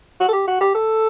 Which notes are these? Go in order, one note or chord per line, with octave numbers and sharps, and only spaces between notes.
F#4
A4
G4
F#4
G4
A4